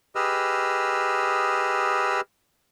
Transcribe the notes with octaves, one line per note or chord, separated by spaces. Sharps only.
G4 G#4 B4 D#5 E6 F6